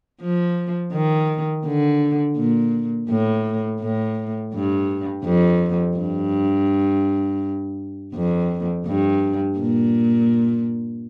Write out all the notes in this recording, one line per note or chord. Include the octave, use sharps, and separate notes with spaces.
F3
D#3
D3
A#2
A2
A2
G2
F2
G2
F2
G2
A#2